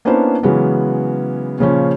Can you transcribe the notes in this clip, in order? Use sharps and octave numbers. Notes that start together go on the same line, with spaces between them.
A#3 B3 C#4 D4 E4 C5
C#3 E3 F#3 G#3 B3 C#4
A#2 C#3 F3 C#4